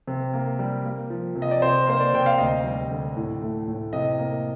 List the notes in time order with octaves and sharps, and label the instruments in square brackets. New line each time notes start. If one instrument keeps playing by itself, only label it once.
[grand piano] C3
A#3
G3
A#3
F3
C3
D#5
D5
C3 C5
A#3 C5
D5
C3 G5
F5
D2 D#5
G3
D3
A2
A3
A2
C3 D#5
A#3